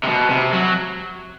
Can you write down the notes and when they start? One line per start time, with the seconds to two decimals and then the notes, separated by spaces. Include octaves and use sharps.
0.05 C3
0.09 B2
0.30 C3
0.52 F#3